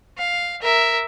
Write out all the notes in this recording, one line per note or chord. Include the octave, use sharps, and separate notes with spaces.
F5
A#4 E5